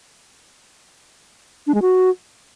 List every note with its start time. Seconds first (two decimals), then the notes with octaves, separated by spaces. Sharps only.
1.67 D4
1.74 G#3
1.82 F#4